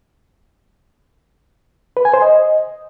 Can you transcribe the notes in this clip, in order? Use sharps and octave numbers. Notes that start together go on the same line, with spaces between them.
B4
G#5
C5
D#5